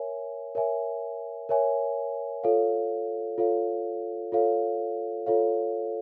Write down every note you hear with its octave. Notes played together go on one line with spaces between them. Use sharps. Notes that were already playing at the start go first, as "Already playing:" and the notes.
Already playing: A#4 C#5 E5 G#5
A#4 C#5 E5 G#5
A#4 C#5 E5 G#5
F4 A4 C#5 F5
F4 A4 C#5 F5
F4 A4 C#5 F5
F4 A4 C#5 F5